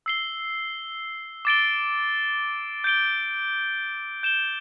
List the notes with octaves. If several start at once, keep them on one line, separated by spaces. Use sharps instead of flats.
E6 C7 G7
D6 A6 D7 G7
G6 D7 G7
G6 E7 G7